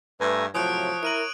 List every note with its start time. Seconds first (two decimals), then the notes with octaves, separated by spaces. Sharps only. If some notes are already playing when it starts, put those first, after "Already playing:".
0.21 G2 A3 B4 G#5 A#5
0.55 A2 C3 F3 F#3 C#5 D#6 F#6 D7
1.03 E4 A#4 D7 D#7 F#7